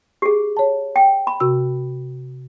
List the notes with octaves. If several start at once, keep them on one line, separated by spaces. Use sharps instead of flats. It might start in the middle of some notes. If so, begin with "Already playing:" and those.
G4 G#4
C#5 A5
G5
B5
C3 F#4 E6